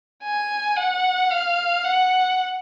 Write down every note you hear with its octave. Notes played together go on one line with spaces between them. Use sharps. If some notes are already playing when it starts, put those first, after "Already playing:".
G#5
F#5
F5
F#5